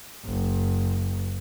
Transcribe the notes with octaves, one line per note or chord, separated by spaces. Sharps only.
F#1